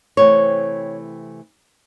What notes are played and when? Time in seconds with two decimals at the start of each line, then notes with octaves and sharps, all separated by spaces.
0.17 C3 E3 A3 C4 C#5